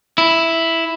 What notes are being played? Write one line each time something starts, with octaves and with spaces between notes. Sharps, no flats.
E4